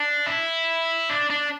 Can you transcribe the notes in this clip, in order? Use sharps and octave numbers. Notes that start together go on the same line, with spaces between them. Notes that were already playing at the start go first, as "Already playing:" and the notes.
Already playing: D4
E4
D4
D4